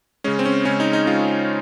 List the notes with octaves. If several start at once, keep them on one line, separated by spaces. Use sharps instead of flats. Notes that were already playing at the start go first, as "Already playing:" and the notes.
C#3 G#3 C#4
C4
C#4
C#3 G#3 C#4
D#4
D#4
C#3 G#3 F4